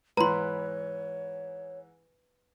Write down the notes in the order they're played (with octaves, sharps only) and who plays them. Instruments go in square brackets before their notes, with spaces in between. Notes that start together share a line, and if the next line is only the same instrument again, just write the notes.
[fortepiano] G#2 E3 [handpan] B4 [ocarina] C#5 [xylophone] A#5 C6